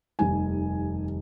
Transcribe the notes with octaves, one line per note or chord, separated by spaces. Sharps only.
F1 D#2 D#3 G3 G#5